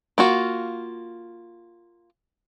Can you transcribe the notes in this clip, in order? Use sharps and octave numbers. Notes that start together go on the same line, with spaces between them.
A#3 F4 F#4